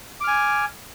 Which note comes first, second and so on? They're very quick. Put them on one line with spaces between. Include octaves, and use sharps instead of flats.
D6 F6 G#5